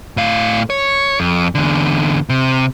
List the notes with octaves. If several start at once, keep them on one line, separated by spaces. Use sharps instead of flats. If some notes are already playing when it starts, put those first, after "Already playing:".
A2 F5
C#5
F2
E2 D3
C3